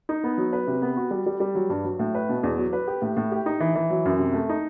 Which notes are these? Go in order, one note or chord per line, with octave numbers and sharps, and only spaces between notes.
D#4
B3
F#3
B4
C3
B3
F#4
G3
G3
G3
F#3
G2
F#3
A2
B4
B2
E2
F#3
B4
G4
A2
A2
G4
D#4
E3
E3
F#3
F#2
C3
A3
D#4